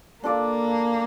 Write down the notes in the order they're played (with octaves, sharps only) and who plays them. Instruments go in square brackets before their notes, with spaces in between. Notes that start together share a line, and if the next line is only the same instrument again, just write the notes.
[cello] A#3 [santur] D4 F4 A4 D5